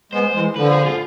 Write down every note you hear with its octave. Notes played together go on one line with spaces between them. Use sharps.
G#3 B3 C5
E3 G#3
D3 F3 B4
G#4
F4